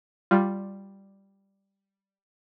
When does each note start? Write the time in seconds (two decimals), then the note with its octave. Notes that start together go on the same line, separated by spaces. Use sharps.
0.31 G3 F4